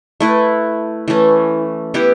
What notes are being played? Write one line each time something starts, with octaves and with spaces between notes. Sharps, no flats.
A3 E4 B4
E3 A3 C#4
E3 B3 E4 G4